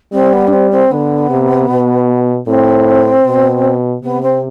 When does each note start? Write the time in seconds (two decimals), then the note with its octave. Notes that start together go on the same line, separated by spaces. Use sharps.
0.13 G3 C4
0.33 B3
0.47 D4
0.52 C4
0.71 C4
0.91 D3 B3
1.30 C3
1.69 B2
2.46 A2 C4
3.26 B2
4.03 C3 B3
4.22 C4